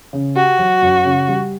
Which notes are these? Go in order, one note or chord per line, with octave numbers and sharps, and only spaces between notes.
C#3
F#4 G4
F#3
F#2
C#3
G3